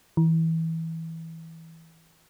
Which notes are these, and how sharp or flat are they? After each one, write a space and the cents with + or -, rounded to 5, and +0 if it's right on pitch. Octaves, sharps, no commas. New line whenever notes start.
E3 -20